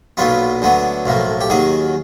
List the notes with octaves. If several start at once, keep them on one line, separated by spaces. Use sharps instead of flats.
B1 A#2 F#3 B3 F4
D2 D3 F#3 B3
B1 A2 F3 A#3
G4
D#2 D#3 F#3 G#4